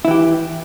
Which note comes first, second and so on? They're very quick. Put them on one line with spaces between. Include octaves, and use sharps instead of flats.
E4 E3 G4